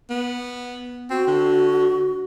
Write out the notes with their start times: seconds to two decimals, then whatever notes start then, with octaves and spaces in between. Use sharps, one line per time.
0.10 B3
1.10 C4 F#4
1.28 D3